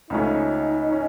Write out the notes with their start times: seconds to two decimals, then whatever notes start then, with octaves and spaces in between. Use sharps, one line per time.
0.10 C#2 C#3 F3 A3 C#4 D#4
0.92 C#4